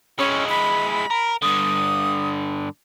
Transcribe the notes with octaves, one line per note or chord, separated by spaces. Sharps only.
G#3 C#4 E4
B5
A#4
G2 D3 D#6